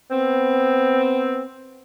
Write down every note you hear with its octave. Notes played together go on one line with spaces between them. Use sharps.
B3 C4